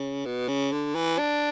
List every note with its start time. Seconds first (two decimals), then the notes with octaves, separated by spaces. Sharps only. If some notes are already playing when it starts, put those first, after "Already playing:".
Already playing: C#3
0.25 B2
0.48 C#3
0.72 D3
0.95 E3
1.18 D4